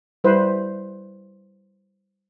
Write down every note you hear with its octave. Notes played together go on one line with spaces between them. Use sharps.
G3 E4 B4 C5